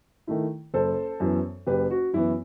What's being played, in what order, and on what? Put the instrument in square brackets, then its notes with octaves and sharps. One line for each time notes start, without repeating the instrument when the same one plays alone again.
[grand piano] D#3 A3 E4
F#1 A4 C5
F#2 E3 B3
F#1 G4 B4
F#4
F#2 E3 B3 E4